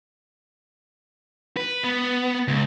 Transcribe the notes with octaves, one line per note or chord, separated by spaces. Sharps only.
B4
B3
C#2